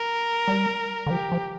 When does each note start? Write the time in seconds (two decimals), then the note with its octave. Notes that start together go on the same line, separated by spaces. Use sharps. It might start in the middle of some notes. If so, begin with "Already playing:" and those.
Already playing: A#4
0.48 G3
1.06 D3
1.10 F3 G4
1.32 F3